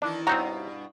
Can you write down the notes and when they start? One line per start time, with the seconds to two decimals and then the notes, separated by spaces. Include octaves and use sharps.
0.02 D#3 E3 D4 E4
0.27 G2 B2 C4 D#4 F#4 C#5 E5 A#5